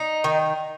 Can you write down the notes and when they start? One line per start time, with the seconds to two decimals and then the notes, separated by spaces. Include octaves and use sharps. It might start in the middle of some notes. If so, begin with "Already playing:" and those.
Already playing: D#4
0.24 D#3